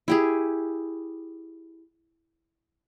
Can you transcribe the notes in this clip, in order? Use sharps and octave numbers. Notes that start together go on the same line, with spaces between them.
E4 G4 G#4